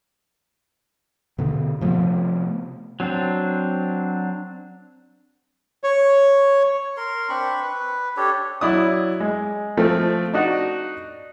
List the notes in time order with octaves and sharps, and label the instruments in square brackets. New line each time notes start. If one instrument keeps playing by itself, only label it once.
[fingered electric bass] B2 D3
C3 F3 A3 B3
[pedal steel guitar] F#3 C4 D4
[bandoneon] C#5
[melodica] A#4 C6
C4 D4 B5 C#6
B4
D4 G4 A4 C#5
[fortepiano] F#3 E4 D5 D#6
G#3
F3 A3 C4
D4 D#4 F#4